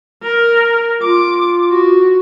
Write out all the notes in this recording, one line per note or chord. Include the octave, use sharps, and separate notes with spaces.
A#4
F4 D6
F#4